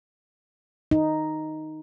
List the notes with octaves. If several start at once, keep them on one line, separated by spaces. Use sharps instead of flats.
D#4